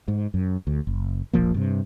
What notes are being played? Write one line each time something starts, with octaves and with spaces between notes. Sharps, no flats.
G#2
F#2
D2
F#1
E1 A#1 F3 A#3
G2 C3